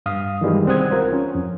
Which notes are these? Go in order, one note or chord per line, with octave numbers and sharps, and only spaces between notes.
G2 F5 D#6
D#3 E3 G3 G#3
C2 C4 F#5 D#6 G#6
F4 A#4 C5
C#4
F2